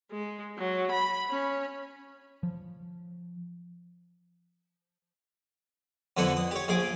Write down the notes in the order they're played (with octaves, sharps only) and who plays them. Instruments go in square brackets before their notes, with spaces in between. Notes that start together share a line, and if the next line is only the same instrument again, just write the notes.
[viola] G#3
F#3
B5
C#4
[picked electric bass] F3
[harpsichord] F2 D3 B3 E4 F#5
D#6
G4 C#5
A#1 G#4 D6